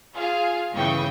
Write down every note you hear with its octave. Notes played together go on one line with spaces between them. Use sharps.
F4 G#4 F5
G1 C#3 E3 G5 C#6 D#6